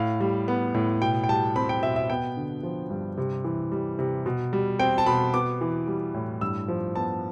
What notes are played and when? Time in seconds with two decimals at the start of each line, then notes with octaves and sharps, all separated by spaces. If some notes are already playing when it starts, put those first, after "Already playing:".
Already playing: A2 F5
0.20 G3
0.48 B3
0.74 A2
1.02 B2 G5
1.24 G5
1.29 G3 A5
1.56 C4 B5
1.69 G5
1.83 B2 E5
1.96 E5
2.10 B3 G5
2.37 D3
2.63 F3
2.90 G2
3.18 C3
3.44 E3
3.72 G3
3.99 C3
4.26 B2
4.53 G3
4.79 C4 G5
4.98 A5
5.06 B2 B5
5.33 B3 D6
5.61 E3
5.87 G3
6.14 A2
6.41 G2 E6
6.68 F3
6.96 B3 A5